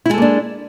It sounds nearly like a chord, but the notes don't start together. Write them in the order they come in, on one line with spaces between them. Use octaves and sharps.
E4 G#3 A4 A#3 D4